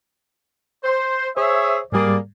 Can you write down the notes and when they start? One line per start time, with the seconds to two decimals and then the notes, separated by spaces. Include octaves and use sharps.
0.84 C5
1.37 G#4 C5 C#5 E5
1.92 G#2 G3 A#3 G#4 D5